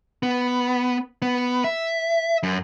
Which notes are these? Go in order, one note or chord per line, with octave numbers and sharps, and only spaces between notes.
B3
B3
E5
F#2